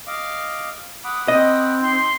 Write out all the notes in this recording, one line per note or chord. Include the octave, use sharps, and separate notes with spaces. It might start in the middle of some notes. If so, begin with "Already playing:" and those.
D#5 F5 D6
F#5 B5 D6 D#6
C4 D#5
D#4 C6